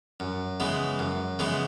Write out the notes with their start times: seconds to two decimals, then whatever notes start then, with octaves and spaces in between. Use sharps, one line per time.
0.20 F#2
0.60 C#3 E3 G#3 B3
0.99 F#2
1.39 C#3 E3 G#3 B3